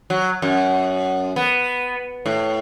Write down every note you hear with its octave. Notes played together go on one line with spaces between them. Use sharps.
F#3
F#2
B3
A2